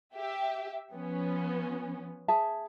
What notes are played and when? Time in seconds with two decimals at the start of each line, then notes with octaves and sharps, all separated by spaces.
0.15 G4 E5
0.93 F3 B3 C#4
2.28 G#4 E5 A5